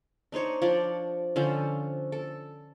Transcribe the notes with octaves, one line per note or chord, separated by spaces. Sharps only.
D4 D#4 C5 C#5
F3 D4 C#5 D5
D3 F3 C#4 C5
A4